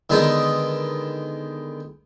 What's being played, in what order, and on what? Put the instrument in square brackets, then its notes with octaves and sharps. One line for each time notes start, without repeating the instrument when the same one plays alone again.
[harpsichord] D3 D#3 G#3 B3 D#4